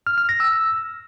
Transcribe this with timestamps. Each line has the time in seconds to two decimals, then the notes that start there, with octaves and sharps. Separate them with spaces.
0.07 F6
0.18 F6
0.29 A#6
0.40 E6